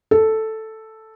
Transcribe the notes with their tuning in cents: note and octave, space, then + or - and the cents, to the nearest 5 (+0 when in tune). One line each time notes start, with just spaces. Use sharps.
A4 +0